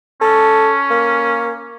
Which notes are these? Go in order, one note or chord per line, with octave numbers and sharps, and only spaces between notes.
C#4 A4
A#3